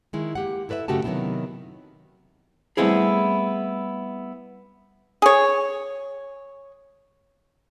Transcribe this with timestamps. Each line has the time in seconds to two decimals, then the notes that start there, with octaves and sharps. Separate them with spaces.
0.13 D#3 G#3 E4
0.35 A#3 G4 F#5
0.69 E4 A4 B4 C#5 E5
0.88 F#2 C#3 A3 F#4 G4 A5
1.04 C3 D#3 F#3 B3 C4 E4
2.77 G3 A3 B3 C4 E4 G#4
5.22 G#4 C#5